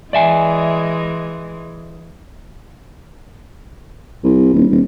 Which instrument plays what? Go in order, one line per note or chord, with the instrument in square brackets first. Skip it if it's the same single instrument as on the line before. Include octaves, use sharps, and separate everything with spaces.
[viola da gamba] E3 G#3 [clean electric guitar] D5 E5 G#5
[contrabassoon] C2
D#1
D#1